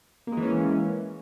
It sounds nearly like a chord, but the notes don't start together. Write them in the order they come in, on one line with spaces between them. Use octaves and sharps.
A#3 G#3 E3 C#4